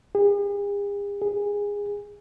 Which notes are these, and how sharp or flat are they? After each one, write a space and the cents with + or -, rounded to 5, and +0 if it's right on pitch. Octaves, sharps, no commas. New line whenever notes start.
G#4 -45
G#4 -20